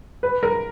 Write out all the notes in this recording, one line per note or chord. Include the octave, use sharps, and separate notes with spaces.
B4
A#4